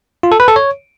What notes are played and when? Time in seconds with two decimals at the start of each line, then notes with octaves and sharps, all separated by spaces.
0.23 F4
0.32 A4
0.40 B4
0.48 A4
0.56 C#5